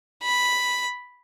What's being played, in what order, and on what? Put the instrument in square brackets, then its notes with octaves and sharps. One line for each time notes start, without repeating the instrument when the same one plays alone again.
[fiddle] B5